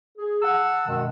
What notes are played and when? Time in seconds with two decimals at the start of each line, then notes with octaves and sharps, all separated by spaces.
0.18 G#4
0.42 F#5 A5 E6
0.87 F#2 B2 D#3 G#3